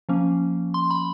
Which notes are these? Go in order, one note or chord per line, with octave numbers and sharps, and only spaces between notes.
F3 A#3 C#4
C6
B5